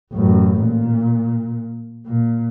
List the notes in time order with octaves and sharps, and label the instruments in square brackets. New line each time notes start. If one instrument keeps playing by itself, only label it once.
[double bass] A1 F#2
A#2
A#2